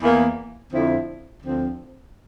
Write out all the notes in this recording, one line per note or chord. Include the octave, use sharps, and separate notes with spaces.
E2 E3 A#3
F2 D3 F3 C4 E4
D2 D3 F3 C4